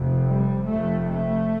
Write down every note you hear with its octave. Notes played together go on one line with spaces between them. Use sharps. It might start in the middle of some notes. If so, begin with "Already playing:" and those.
Already playing: F1 F2 C3
G3
F1 F2 C3 A3
A3